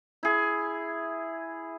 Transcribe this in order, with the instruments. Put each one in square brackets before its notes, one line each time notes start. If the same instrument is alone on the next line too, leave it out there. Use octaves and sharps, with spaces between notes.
[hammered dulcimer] E4 G#4